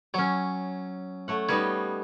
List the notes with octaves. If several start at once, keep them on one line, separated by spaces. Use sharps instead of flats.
F#3 C#4 C#5
A3 C#5 F#5
G3 B3 D#4 C#5